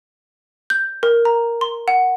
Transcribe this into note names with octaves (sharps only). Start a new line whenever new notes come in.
G6
A#4
A#5
C6
F#5